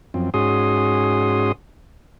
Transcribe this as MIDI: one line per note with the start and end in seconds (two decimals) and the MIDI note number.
0.14 0.30 42
0.14 0.30 53
0.14 0.30 60
0.34 1.52 44
0.34 1.52 61
0.34 1.52 66
0.34 1.52 68
0.34 1.52 84
0.34 1.52 87